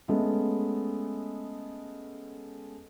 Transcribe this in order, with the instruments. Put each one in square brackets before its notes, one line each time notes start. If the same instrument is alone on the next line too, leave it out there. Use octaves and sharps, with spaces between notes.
[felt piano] G#3 A3 B3 C#4